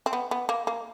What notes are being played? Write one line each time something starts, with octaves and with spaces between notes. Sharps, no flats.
C4
B3
B3
A#3
A#3